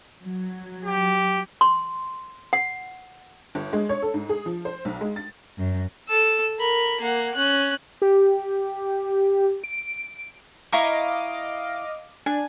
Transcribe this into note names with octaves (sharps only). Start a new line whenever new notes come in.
F#3
G4
C6
F#5
G1
G#3
C#5
A4
G#2
G#4
F3
C5
B1
G#3
A6
F#2
A4 E6
A#4 B5
A#3 F#5
C#4 F#6
G4
D7
E4 D#5 F5 A#5 C#6 D6
D4 G#5